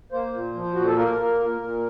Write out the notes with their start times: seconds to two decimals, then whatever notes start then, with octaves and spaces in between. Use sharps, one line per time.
0.12 A#3 C5
0.33 A#2
0.54 F3
0.74 A#2 F#4
0.86 A4
0.97 A#3 A#4
1.18 A#3
1.40 A#2
1.61 A#2